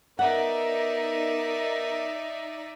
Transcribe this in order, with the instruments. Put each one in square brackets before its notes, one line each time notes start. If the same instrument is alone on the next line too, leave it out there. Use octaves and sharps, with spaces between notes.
[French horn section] B3 A#4 [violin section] D#4 D5 E5 [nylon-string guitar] F#5